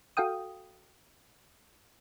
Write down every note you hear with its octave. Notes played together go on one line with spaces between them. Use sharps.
F#4 A4 F5 G5 D#6